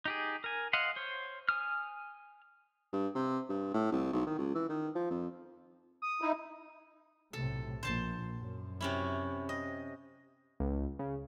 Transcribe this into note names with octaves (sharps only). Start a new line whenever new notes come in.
D#4 G4 G#4
A#4 G#5
D#5 F5 F#5 C6
C5 C#5
G#5 D#6 F6
G2
C3
G2
A2
C2
B1
D#3
C#2
E3
D#3
F3
F2
D#6
D#4 E4
B1 A2 C3 A4
A#1 C5 A5 C6
F#2
C3 C#4 E4
D#5
C#2
C#3